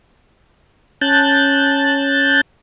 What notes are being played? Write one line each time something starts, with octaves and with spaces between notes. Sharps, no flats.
C#4 A5 F#6 G6 A6